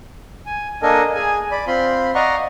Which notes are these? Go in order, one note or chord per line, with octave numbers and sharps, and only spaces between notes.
G#5
A#3 D4 A4 A#4 D#5 G#5
G#4 G#5
D5 B5
C4 F4 B5 C6
D5 D#5 F5 F#5 A#5 C#6